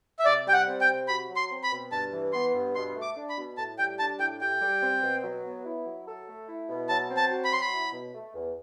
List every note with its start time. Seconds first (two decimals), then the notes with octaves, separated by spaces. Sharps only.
0.19 E5
0.25 C3 D5
0.47 G3 G5
0.53 F#5
0.67 C4
0.81 G5
0.88 C3
1.08 F#4 B5
1.30 F#3
1.36 C6
1.50 C4
1.64 B5
1.71 B2
1.91 G2 A5
2.12 E3
2.33 B3 C6
2.54 G2
2.75 B2 C6
2.96 A3
3.02 D6
3.16 D4
3.29 B5
3.37 B2
3.57 A2 A5
3.78 G3 G5
3.99 D4 A5
4.19 A2 G5
4.40 G4 G5
4.61 G3
4.82 C4
5.03 B2
5.23 F#3
5.45 B3
5.65 E4
5.86 F#3
6.06 A4
6.28 A3
6.48 E4
6.69 B2
6.89 F#3 A5
7.10 C4
7.17 A5
7.31 F#4
7.44 B5
7.51 F#3 C6
7.61 B5
7.73 E4
7.93 B2
8.14 A3
8.35 E2